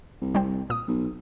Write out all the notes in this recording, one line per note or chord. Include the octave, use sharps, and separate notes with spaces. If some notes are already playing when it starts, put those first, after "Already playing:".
C2
G3 C4
A#2 D#6
B1